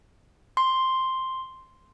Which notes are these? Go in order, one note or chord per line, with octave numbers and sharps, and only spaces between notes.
C6